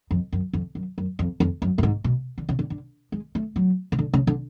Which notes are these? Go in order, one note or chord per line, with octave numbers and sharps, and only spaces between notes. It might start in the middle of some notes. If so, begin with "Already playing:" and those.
F2
F#2
F2
F#2
F#2
F2
F2
F#2
A2
G#2
B2
D3
C#3
D3
D3
G#3
A3
F#3
C#3
D3
C#3
D3